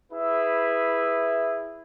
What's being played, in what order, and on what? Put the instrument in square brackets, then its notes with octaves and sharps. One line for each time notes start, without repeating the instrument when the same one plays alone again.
[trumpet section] E4 G#4 B4 E5